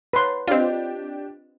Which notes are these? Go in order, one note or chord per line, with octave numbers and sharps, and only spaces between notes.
B4 C#5 A#5 C6
C4 D4 F4 G4 D5 D#5